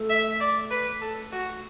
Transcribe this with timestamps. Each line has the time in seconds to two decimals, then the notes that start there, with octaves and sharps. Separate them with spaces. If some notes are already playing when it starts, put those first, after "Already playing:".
Already playing: A3
0.10 E5
0.40 D5
0.71 B4
1.02 A4
1.32 F#4